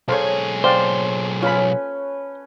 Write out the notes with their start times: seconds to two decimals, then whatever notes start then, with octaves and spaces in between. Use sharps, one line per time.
0.08 B1 G#4 A4 C5 C#5 F5
0.64 C5 D5 F5 G5
1.42 C#4 F4 B4 B5